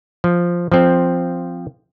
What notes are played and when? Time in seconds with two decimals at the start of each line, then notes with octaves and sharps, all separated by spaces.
0.24 F3
0.72 F3 C4